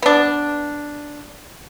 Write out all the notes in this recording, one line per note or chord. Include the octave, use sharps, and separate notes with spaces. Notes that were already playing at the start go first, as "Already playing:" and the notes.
B3 D4